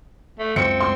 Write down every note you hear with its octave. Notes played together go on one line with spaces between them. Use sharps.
A3
C#2 F#2 C4 C#7
C6